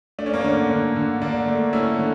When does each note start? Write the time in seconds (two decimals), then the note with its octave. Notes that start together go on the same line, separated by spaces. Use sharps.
0.19 A3 D4
0.26 C#4
0.34 A#3
0.41 D3 C#4
0.70 D3
0.96 D3
1.22 D3 A#3 D4
1.48 A3
1.73 A3 C#4 E4
1.99 D3